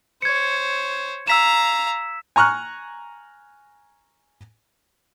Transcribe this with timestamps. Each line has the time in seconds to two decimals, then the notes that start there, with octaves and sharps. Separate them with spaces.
0.22 C5 C#5 G#6 C#7
1.28 F5 A#5 E6 B6 E7
2.36 G#5 A#5 C#6 F6 F#6